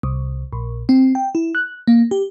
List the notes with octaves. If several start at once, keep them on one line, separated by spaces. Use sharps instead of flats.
C2
A#1
C4
G5
E4
F#6
A#3
G4